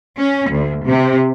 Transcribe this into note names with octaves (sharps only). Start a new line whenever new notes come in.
C#4
D2
C3